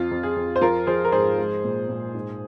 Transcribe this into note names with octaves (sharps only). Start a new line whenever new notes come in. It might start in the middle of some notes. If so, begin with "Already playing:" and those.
Already playing: F2 F4
F2
G#4
F2
C5
F3 F4 A#4
F3 G#4 C5
A#4
G#2 G#4 C5
G#3
A#2
A#2
G#2